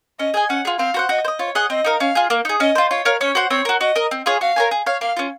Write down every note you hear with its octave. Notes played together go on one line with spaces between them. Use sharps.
C#4 D#5
G#4 D#5 G#5
C#4 F#5
F4 G#4
C4 F5
F#4 C5 F#5
F#4 D#5
C5
D#5
F4 C#5
G#4 D#5 F#5
C4 D#5
D#4 A#4 F5
C#4 F5
F4 G#4
A#3
D#4 G#4
C#4 D#5
F4 C5
F4 C#5
A#4 C#5 F5
C#4 C#5
F#4 C5 F#5
C4 C#5
F#4 A#4
F#4 D#5
A#4 D#5
C4
F4 G#4 C#5
F#4 F5
A#4 C#5 G#5
G#4
C#5 F5
A#3 F5
C#4 F4